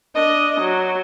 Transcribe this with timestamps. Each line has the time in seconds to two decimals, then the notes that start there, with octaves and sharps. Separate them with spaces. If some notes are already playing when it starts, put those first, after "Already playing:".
0.14 D4 D#5
0.60 F#3